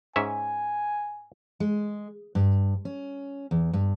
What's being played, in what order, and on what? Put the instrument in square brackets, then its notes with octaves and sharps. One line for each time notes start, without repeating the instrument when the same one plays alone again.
[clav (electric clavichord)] G#2 C#4 E5 [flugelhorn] G#5
[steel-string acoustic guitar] G#3
G2
C#4
E2
G2